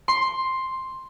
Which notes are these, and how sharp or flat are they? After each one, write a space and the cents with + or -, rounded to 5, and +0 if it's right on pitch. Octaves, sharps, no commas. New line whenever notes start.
C6 +5